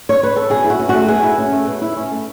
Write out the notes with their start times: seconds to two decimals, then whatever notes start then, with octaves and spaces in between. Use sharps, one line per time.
0.09 C#5
0.23 B4
0.36 A4
0.50 B2 G#4
0.64 E4
0.70 F#4
0.79 C#4
0.89 F#4
0.94 A3
1.08 B2 G#4
1.23 E4
1.38 C#4
1.52 A3
1.67 B2
1.82 E4
1.96 C#4
2.11 A3